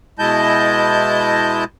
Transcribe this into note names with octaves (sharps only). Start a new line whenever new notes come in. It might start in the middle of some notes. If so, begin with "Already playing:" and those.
B2 G#3 E4 D#5 A5 G6